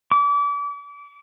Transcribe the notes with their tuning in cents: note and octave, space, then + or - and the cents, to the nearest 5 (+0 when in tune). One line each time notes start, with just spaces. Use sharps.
D6 -35